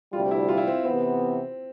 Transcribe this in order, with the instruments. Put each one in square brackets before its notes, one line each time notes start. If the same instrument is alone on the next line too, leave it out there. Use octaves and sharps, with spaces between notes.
[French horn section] D2 C3 G3 [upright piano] F4
[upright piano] E4
F4
E4
C4
[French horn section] C3 E3 B3 [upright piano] C4